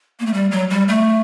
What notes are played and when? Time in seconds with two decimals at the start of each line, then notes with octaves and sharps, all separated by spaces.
0.20 A#3
0.26 A3
0.34 G3
0.51 F#3
0.70 G3
0.88 A3